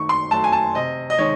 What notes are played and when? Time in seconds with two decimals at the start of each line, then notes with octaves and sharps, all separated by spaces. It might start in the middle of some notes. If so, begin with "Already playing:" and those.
Already playing: D#3 A3 C#6
0.09 C6
0.31 F#3 A3 A5
0.44 G#5
0.52 A5
0.74 C3 D#5
1.10 D#5
1.18 D#3 G#3 C#5